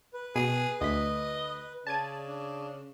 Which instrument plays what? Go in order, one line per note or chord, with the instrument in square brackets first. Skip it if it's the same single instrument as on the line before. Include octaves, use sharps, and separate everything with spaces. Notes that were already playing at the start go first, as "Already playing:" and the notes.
[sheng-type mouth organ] B4
[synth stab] B2 [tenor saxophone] G#4
[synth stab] D2 B6 [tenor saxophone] D#5
[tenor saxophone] C#3 [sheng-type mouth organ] D5 [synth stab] A5 G#6 D#7
[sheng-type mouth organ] D4